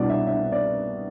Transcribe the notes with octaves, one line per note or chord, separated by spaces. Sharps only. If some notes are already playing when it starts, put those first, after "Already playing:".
Already playing: C2 B2 B3 D4 D5
E5
E5
D5